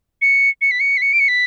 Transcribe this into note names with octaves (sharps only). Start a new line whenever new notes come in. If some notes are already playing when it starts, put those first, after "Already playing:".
C#7
C#7
B6
C#7
B6
C#7
D7
C#7
B6